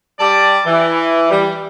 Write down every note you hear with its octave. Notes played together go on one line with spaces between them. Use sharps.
G3 D5 A5
E3
G3